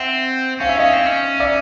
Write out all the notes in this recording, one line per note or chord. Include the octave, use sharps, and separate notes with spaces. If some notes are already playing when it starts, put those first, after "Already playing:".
Already playing: C4 E5 F#5
C#4 F5
E5
C#4 D#5 F5
C4
C#4
D5 E5